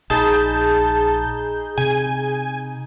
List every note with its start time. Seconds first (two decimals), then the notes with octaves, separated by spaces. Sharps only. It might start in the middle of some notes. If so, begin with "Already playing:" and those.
0.10 A#1 D#4 G#4 A5 B5 G6
1.78 C3 G#5